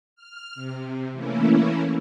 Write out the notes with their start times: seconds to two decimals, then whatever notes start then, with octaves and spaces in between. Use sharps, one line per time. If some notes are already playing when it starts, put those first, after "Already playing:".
0.16 F6
0.55 C3
1.12 E3 A3 A#3 C#4 E4